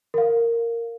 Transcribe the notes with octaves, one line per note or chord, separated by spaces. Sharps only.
A#4 F5